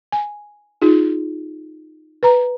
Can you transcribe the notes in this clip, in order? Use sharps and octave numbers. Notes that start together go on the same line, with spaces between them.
G#5
D#4 F4 G#4
B4 A#5